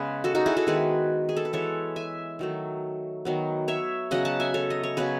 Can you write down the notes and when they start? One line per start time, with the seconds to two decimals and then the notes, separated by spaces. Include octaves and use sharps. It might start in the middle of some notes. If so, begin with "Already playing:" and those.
Already playing: C#3 G#3 B3 G#4 B4
0.24 F#4 A4
0.35 D#4 F#4
0.46 E4 G#4
0.57 F#4 A4
0.67 D#3 G#3 B3 G#4 B4
1.29 G#4
1.36 A4
1.45 B4
1.53 E3 G#3 B3 A4 C#5
1.96 E5 G#5
2.39 D#3 F#3 A3
3.25 D#3 F#3 B3
3.68 C#5 E5
4.11 C#3 F#3 B3 D#5 F#5
4.25 F#5 A5
4.40 E5 G#5
4.54 A4 C#5
4.70 D#5
4.83 C#5
4.97 C#3 F#3 B3 G#4 B4